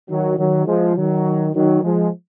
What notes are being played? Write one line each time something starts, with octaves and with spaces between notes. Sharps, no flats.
D#3 F#3
D#3 F#3
F3 G#3
D#3 F#3
D#3 F#3
F3 G#3